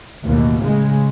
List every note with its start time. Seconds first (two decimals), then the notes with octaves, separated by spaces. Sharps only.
0.24 A1 D#2 B2
0.61 C#3 G#3